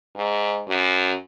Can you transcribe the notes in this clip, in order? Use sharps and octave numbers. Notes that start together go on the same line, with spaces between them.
G#2
F#2